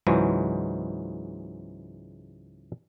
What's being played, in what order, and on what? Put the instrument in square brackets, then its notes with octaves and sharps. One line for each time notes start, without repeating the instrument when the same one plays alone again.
[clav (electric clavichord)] C#2 G#2 E3 F#3 G#3